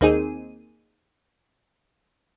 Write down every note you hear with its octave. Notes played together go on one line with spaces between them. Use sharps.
D#2 A#3 C4 D#4 G#4 D#7